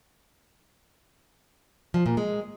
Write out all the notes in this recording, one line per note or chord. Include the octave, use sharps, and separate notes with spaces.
F3
A#2
G#3